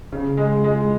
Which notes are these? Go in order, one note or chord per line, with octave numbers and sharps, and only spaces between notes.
C#3
G#3
G#3